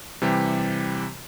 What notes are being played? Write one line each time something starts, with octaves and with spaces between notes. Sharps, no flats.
C3 E3 G3 G4